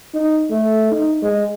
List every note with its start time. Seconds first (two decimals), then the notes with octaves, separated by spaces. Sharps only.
0.14 D#4
0.50 A3
0.91 D#4
1.23 G#3